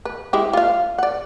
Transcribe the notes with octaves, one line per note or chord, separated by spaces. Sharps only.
B4
G#3 E4 G4
F4 F5
D5 F#5